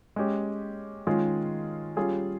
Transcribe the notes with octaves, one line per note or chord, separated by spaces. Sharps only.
G#3 C#4 G4
D#3 G#3 C#4 F4 G#4
G3 C#4 F4 G#4